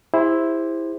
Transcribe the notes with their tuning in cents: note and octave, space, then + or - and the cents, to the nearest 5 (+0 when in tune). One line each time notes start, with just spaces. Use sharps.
E4 +0 G4 +45 C5 +0